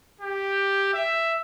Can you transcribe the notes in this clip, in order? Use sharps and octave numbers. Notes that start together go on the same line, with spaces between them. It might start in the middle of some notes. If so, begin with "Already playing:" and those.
G4
E5